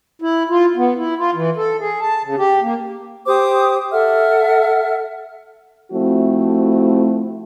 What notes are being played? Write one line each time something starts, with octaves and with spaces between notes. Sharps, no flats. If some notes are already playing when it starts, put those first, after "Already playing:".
E4
F4
B3
E4
F4
E3
A4
G#4
A5
C#3
G4
A#3
G4 C5 D6 D#6
A4 E5 F#5 F6
F3 A3 C4 E4 F#4